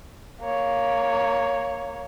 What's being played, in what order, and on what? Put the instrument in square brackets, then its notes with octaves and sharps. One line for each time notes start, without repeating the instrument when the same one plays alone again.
[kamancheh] A#3 C#5